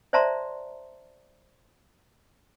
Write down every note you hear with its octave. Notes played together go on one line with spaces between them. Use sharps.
C5 D5 E5 A5 A#5 C6